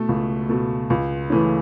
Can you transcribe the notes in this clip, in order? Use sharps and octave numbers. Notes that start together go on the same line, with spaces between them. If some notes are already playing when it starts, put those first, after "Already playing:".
Already playing: B2 A3
C#2
B2 A3
C#2
C#3 E3 A3 C#4